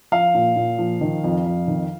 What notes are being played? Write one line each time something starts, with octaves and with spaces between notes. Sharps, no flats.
F3 F5
A#2
A#2
F3
D#3
F2
F2
D#3